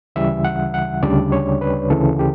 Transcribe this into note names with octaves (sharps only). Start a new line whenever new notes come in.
D2 C#3 E3 G3 E5
F#5
F#5
D2 C#3 G3 D4 D5
C#5
B4
D2 C#3 E3 A4
G4